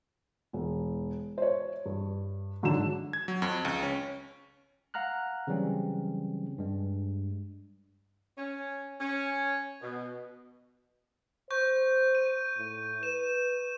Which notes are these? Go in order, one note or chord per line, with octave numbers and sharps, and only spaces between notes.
E1
C5 C#5
G2
G#2 D3 F#3 D4 E7
G#6
F#3
F2
C#2
C#4
F5 F#5 A#5 F6 F#6
C#3 E3 F#3 G3 C4 C#4
G2 G#3
C#4
C#4
B2
C5 C#6 G6
D#7
A2
B4 E7